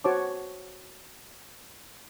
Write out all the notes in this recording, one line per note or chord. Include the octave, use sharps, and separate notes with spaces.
F#4 C5 C#5 A5 D6